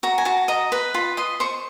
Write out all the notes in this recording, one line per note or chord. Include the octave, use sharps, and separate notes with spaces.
F#4 A#5
G#5
F#4 A5
D#5 A#5
B4 B5
F4 B5
D#5 C6
C5 C#6